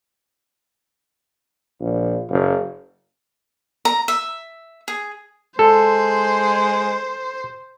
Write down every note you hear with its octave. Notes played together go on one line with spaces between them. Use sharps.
A#1
F#1
A#5
E5
G#4
G#3 A4 C5